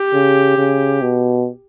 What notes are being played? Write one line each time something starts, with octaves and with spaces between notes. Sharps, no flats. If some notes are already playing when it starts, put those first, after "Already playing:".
Already playing: G4
C#3
C#3
B2